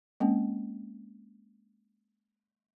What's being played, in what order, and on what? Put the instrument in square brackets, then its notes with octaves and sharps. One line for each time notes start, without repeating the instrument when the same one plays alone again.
[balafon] G#3 A#3 C4 C#4